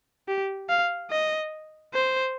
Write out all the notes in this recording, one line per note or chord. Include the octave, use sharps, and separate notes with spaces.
G4
F5
D#5
C5